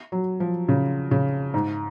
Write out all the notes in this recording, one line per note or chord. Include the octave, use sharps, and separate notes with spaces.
F#3
F3
C#3
C#3
G#2